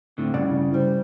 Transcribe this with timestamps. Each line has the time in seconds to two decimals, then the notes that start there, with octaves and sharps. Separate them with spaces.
0.18 D2 A2 D3 C4
0.34 G2 C#3 D5 F#5
0.47 E4
0.74 G3 C5